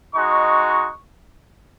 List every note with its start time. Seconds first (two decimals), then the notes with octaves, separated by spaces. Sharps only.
0.15 G#3 D#4 F#4 C#6